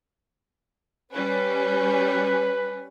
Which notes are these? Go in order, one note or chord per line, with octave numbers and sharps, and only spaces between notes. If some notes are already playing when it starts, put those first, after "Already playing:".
G3 C#4 B4